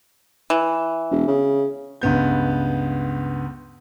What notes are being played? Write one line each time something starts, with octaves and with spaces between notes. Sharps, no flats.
E3
E1
C#3
C#2 G2 B3 G6